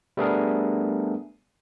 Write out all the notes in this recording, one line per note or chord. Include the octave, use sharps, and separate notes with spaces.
G3 A3 B3 D4 G#4 A#4